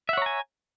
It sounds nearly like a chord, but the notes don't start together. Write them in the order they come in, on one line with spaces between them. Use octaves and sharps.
E5 F#5 C#5 A#5 G#5